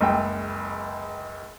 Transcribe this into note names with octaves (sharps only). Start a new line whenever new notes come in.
F#1 C#2 G5